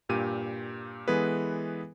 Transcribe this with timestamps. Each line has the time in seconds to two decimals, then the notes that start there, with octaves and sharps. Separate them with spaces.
0.09 G2 A#2 G4 D#7
1.08 E3 G#3 B3 G#4 A4 B4